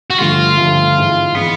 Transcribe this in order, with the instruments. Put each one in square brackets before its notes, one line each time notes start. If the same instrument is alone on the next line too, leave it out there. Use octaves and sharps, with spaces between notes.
[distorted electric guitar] F#4
[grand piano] G2 D3 F3 A3 [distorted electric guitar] F4
[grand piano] G2 D3 F3 A3
G#2 E3 G#3
[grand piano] E3 G#3 [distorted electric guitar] B3